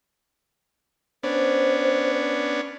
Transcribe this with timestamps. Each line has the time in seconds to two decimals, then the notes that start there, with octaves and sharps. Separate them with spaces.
1.23 B3 C#4 D4 C5